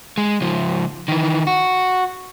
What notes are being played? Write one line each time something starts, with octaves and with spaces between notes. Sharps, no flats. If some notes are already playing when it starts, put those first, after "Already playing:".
G#3
C#2 F3
D#3 E3
F#4